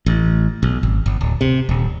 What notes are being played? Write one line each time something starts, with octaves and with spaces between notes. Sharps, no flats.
A1
B1
G#1
G1
D1
C3
D#1